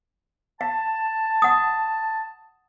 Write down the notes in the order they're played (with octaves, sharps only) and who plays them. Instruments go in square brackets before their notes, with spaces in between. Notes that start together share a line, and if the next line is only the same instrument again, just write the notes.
[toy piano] F5 [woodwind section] A5
[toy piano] F#5 D#6